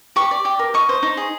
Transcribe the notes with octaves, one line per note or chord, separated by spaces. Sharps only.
G4 C#6
D5
G4
A#4
D#5 C#6
C5
D#4
G#4